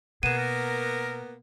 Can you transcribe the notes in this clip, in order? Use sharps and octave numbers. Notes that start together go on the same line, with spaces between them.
B2 A#3 B3 G#4 D#7 E7
A#4